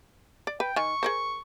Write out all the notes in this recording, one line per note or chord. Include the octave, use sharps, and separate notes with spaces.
D5
B4 G5
D#3 G#5 C#6
G#4 A#4 C5